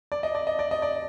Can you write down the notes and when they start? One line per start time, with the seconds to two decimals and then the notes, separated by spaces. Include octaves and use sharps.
0.12 D5
0.23 D#5
0.35 D5
0.47 D#5
0.59 D5
0.71 D#5
0.82 D5